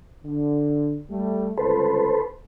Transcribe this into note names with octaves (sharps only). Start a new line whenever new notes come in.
D3
G3 A3
G1 C#2 A4 B4 C5